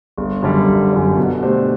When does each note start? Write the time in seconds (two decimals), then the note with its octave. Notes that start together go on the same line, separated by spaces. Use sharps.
0.18 G1
0.43 F#2 D3 G3
0.68 G1
0.93 F#2 D3 G3
1.17 B2
1.42 A3 D4 G4 C5